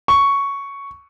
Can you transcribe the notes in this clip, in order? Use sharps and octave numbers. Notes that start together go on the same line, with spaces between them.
C#6